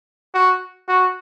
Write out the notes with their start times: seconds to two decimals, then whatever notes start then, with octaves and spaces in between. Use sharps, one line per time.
0.34 F#4
0.88 F#4